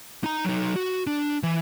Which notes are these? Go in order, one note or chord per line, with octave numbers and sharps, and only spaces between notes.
D#4 A#5
F#3 D#4
F#4
D4
E3